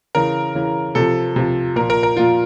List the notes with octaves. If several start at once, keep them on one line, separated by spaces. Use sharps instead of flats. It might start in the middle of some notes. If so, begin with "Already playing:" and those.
C#3 E3 A#4
C#3 E3
C3 F3 A4
C3 F3
A#2 F3 A#4
A#4
A#4
A#2 F3 F4